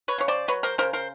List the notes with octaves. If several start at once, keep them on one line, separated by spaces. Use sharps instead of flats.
B4 C#5
C#3 C#5
C5 D5
F#3 B4 C#5
A#4 C5
C#3 A#4 C5
A#4 C5